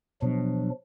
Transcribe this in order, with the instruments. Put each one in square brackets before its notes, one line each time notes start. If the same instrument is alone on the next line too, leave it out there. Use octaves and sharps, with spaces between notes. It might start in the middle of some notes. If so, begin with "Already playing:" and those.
[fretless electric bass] B2 [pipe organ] F3 F#3 D4